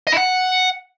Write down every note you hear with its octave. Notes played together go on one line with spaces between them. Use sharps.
D#5
E4
F#5